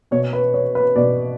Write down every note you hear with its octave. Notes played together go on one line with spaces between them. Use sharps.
B2 C#5
B4
C#5
B4
B2 D5